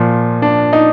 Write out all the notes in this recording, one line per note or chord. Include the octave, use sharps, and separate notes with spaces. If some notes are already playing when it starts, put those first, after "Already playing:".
Already playing: A#2 F3
D4
D#4